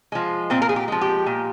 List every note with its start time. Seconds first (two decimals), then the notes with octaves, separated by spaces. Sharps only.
0.12 F3 G#3
0.50 A#2 C4
0.62 A#4
0.69 G#4
0.76 G4
0.88 F3 G#3
1.01 G4
1.26 A#2